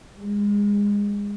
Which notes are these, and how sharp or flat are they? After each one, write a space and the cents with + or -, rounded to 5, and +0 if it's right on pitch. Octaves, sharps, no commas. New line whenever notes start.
G#3 -25